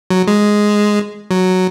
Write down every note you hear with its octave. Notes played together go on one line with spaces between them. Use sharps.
F#3
G#3
F#3